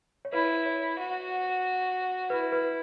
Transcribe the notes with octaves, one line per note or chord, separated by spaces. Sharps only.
C#5
E4 B4
C#5
F#4
E4 B4
B4